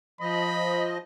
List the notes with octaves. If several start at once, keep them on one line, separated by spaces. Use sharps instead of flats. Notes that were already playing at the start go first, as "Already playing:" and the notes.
F3 D#5 B5